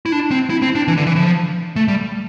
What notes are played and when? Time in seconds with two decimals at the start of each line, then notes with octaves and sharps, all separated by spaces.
0.06 E4
0.12 D4
0.31 C4
0.50 E4
0.62 C4
0.75 D4
0.88 E3
0.97 D3
1.07 E3
1.16 F3
1.76 A3
1.88 G3